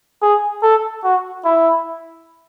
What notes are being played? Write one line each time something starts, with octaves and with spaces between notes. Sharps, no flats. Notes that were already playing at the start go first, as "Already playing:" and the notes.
G#4
A4
F#4
E4